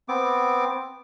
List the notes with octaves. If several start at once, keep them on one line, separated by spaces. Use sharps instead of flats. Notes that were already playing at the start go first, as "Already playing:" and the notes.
B3 C4 D6